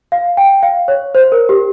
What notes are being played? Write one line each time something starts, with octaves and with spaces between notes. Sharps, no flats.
F5
G5
F5
C#5
C5
A#4
G4